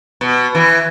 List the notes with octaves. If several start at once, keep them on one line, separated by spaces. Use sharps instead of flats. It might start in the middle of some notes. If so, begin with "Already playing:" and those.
B2
E3